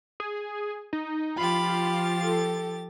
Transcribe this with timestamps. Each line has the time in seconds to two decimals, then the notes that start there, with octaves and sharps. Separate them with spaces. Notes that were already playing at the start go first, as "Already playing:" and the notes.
0.20 G#4
0.93 D#4
1.38 F3 F4 G4 B5 A6
2.25 A4